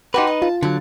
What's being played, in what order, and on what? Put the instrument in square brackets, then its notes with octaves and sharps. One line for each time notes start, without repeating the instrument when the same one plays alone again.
[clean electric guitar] D#4 B4 [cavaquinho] F#4 G4 C6
[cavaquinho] D#5
[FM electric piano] F4 [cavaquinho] A5
[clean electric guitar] D3 F#3 [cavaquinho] A5